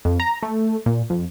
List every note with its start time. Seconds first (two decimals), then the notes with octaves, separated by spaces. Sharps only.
0.05 F2
0.20 A#5
0.43 A3
0.86 A#2
1.10 F2